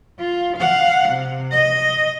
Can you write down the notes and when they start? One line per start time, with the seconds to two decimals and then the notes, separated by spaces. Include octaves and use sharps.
0.20 F4
0.58 F5 F#5
1.10 C3
1.52 D#5